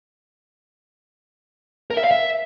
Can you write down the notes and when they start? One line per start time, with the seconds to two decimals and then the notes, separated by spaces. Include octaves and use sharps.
1.90 A#4
1.97 E5
2.04 F5
2.11 E5